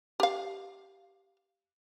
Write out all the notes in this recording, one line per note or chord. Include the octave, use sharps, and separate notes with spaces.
G4 F5